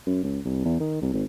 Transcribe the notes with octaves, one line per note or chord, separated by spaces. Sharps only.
F#2
C#2
C2
E2
D#3
C2
G#1